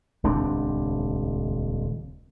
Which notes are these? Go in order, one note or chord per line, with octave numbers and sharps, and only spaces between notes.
D#1 C#2 C4 D4